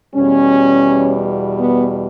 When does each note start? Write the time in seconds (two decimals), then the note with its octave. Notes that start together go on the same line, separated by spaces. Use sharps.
0.15 E2 B2 G3 C#4
1.58 B3